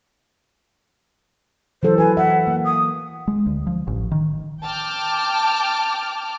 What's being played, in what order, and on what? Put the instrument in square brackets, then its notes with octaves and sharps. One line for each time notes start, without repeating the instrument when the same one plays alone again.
[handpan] E3 F#3 A4 [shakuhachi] C5
[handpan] B4 [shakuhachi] G#5
[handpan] E5 [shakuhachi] F#5
[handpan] A#3
[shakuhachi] D#6
[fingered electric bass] G#3
D2
F3
A1
D#3
[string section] G5 A5 D6 F6